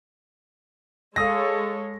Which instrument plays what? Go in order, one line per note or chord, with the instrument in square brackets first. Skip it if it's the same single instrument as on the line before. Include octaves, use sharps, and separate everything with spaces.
[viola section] G#3 A4 C#5 [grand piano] F5 D#6 A#6